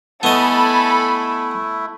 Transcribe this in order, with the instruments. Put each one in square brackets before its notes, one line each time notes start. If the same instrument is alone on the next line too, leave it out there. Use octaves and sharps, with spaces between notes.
[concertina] A3 E4 [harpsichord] B3 D#5 [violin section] A4 G#5 B5